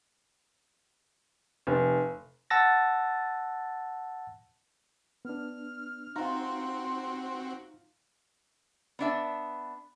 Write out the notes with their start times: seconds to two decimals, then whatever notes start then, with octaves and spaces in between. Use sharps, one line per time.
1.67 F1
2.50 F#5 A5 E6 A6 A#6
5.25 B3 D4 F6
6.16 C4 D#4 F4 F#4 A#5 C6
8.99 B3 D4 E5